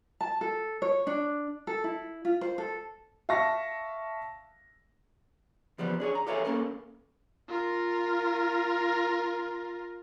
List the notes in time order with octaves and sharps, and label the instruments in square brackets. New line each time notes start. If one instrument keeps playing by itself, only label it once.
[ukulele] A5
A4
C#5
D4
A4
E4
F4
C5
A4
[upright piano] E5 F5 A5 C#6 A#6
[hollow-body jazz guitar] E2 F3 G3 B3
D4 G#4 C#5
A#5
G4 A4 C#5 E5 F5 G#5
A#3 C#4 A4 A#4
[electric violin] F4 A#4